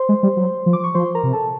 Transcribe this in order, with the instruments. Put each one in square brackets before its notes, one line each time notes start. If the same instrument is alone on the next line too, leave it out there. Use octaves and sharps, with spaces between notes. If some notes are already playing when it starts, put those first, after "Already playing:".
Already playing: [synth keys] C5 C6
[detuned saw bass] G#3
G3
F#3
F3
[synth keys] D6
C#6
[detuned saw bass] F3 [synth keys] C5 C6
[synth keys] A#4 A#5
[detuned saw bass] C3
[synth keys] A4 A5